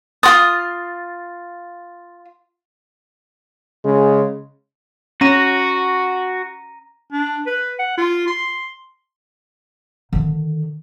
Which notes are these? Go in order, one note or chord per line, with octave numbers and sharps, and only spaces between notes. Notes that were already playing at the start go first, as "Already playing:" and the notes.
F4 F#4 C6 D#6 A6
C#3 G#3
C#4 F#4 A#5 A#6 D#7
D4
B4
F#5
F4
C6
D3 D#3